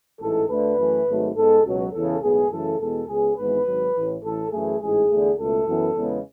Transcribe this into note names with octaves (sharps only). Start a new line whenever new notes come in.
A1 G#2 E3 A4
D2 D3 A3 B4
F#2 E3 A3
G#1 G#2 F#3 A3
G#2 G#3 B3 A4
C#2 B2 F#3
E2 C#3 E3 A4
B1 A2 G#3 B3 G#4
F#2 C#3 E3 A3 A4
E2 B2 G#3 B3 A4
C#2 C#3 G#3 B3 G#4
G#1 G#2 E3 G#3 B3 B4
G#1 G#2 F#3
A1 A2 E3
A1 A2 E3 A4
F#2 E3 A3 G#4
A1 G#2 G#3 G#4
E2 D3 A3
C#2 B2 A3 A4
F#2 E3 B3
E2 C#3 G#3 B3